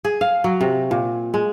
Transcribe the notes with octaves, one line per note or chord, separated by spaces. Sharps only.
G#4
F5
F#3
C3
A#2
G#3